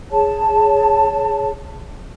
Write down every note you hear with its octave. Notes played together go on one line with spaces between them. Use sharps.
G#4 C#5 A5